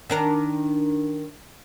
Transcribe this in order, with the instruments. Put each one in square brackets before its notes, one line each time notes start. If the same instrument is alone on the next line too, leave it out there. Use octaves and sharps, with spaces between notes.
[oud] D#3 D4 A#4